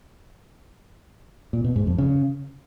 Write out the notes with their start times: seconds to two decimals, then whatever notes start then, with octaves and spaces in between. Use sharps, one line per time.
1.53 A#2
1.64 B2
1.76 G#2
1.87 F2
1.98 C#3